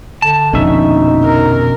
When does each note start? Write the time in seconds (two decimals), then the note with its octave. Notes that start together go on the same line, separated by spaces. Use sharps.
0.22 D3 A5
0.53 A#1 F2 B2 D3 C#4 D#4 E5
1.24 A#4